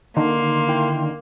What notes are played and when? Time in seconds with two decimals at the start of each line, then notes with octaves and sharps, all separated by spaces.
0.17 D3 D#3 A#3 C6
0.68 E4 G5